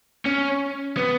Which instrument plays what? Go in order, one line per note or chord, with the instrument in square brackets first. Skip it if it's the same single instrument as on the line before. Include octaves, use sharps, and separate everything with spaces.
[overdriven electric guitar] C#4
B3